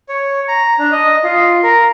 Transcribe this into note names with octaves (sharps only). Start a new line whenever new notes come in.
C#5
A#5
D4
D#5
F4
A#4